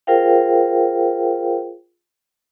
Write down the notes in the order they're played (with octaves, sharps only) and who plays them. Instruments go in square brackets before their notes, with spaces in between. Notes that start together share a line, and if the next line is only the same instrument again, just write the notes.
[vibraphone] F4 G#4 A#4 C5 F5 G5